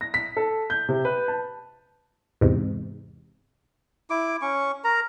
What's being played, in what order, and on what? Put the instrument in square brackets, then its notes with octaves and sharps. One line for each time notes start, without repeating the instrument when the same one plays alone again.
[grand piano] A#6
B6
A4
G6
C3
B4
A5
[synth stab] E2 G#2 C3
[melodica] E4 D6
C#4 C#6
A#4 A#5